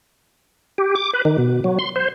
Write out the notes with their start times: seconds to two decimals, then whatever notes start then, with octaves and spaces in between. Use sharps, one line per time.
0.78 G4
0.95 D6
1.13 B4
1.25 D#3
1.38 B2
1.64 F#3
1.79 C6
1.96 C5